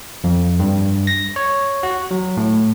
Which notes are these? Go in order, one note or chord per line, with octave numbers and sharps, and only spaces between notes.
F2
G2
A#6
C#5
F#4
F#3
A2